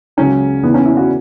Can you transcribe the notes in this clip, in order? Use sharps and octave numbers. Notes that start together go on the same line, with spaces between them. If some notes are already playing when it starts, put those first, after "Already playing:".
C#2 C#3 F#3 C#4
E2 C#3 E3 B3
C#4
E4
F#4